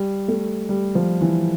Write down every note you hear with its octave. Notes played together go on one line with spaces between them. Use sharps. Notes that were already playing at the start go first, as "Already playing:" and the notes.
Already playing: G3
A3
G3
F3
E3